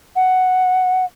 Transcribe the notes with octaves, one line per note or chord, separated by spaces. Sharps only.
F#5